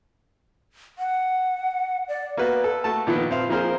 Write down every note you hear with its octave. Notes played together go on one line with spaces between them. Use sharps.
F#5
D5
A#3 B3 F#4 B4
A4
A3 F#4 A5
A#2 D#3 F3 B3
C4 F5
F3 A#3 C4 G#4 A#4 C5